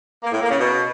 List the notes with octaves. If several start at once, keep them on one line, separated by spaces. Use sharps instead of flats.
A#3
A2
A#3
C#3
B2